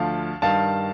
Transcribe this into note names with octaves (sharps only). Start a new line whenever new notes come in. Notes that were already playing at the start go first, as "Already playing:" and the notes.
Already playing: D2 D3 F3 F5 A5
G2 D#3 G3 F5 A5